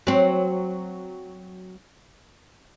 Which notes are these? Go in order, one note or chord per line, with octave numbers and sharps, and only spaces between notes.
F#3 C4